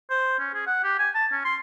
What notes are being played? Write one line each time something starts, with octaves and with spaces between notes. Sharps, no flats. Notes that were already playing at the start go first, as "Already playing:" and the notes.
C5
C#4
G#4
F#5
G4
G#5
A5
C#4
C6